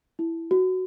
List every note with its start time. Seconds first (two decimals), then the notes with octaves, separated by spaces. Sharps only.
0.19 E4
0.51 F#4